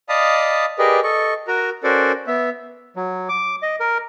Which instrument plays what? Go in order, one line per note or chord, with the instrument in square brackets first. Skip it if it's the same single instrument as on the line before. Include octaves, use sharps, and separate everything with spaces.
[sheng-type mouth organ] D5 D#5 F5 A5 B5 D#6
G4 G#4 A#4 B4 D5 D#5
A4 D#5 C#6
F#4 A#4 A#5
C#4 F#4 A4 A#4 C5 D5
B3 E5
[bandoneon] F#3
D6
D#5
A#4